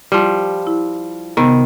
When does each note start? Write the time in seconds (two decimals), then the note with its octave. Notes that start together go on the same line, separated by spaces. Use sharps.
0.12 F3 G3
0.67 E4
1.37 C3 D#3 B3